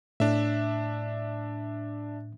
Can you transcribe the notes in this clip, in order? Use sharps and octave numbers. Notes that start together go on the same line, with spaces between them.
A2 D4 E5